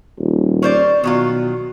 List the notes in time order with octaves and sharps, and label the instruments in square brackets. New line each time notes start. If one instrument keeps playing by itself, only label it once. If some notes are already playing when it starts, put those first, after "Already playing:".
[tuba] D#1
[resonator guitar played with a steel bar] C#4 C5 D5
[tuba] B2 [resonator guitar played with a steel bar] D#3 F#3 F4